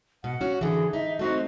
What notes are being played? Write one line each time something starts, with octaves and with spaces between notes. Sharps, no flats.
B2 F#5
C#4 F#4
D3 E3 G#4
D#4 E5
A3 C4 D#4 F#4